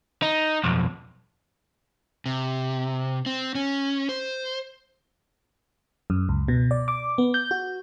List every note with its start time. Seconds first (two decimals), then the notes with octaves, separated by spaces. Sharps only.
0.22 D#4
0.64 B1 F2
2.26 C3
3.26 C4
3.55 C#4
4.09 C5
6.10 F#2
6.29 C#2
6.48 B2
6.71 D5
6.88 D6
7.18 B3
7.34 G6
7.51 F#4